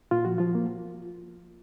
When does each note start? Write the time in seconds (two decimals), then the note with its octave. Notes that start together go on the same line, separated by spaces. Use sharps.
0.11 A#2 F4
0.25 F3 F#4
0.38 F3 F4
0.55 A#3